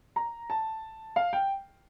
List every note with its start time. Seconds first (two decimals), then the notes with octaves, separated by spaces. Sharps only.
0.16 A#5
0.50 A5
1.16 F5
1.33 G5